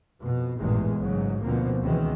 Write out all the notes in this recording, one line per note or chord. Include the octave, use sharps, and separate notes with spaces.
F2 B2
A1 E2 G2 A#2 D#3 G#3
A1 G#2 C#3 F#3
D2 B2 D3 F3 A#3 C4
C#2 B2 D#3 E3 G#3